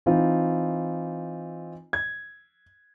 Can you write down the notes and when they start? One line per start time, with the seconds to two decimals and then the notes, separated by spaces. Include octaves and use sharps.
0.06 E3 C4 D#4 F4
1.93 G#6